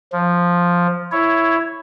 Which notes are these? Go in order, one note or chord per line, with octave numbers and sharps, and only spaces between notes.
F3
E4 C#5